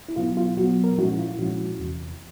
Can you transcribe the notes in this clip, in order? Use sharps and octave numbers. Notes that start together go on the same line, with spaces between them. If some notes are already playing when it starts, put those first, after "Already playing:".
E4
B2 F#3 B3 F4
F4
B2 F#3 B3 F#4
A#4
A#2 F3 G#3 C#4 E4 F#4
F4
A#2 F3 G#3 C#4 E4 F#4
E2 C3 E3